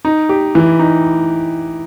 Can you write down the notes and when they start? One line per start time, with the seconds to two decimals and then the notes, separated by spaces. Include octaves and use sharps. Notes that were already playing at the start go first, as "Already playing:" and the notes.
0.05 D#4
0.29 G4
0.55 E3
0.79 D#4